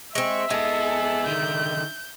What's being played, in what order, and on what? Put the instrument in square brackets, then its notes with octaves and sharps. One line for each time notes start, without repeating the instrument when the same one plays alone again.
[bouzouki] G#3 C4 [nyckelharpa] E5 [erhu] C#6
[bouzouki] G#3 [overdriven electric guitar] B3 G#4 [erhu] A4
[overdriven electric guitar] D3 D#3 [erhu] G6